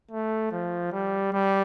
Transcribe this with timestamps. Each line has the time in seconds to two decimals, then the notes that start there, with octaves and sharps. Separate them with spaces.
0.11 A3
0.52 F3
0.93 G3
1.33 G3